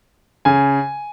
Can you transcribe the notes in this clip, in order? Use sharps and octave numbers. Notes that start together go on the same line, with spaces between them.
C#3 G#5